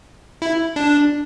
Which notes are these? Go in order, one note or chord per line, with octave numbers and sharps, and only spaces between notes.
E4
D4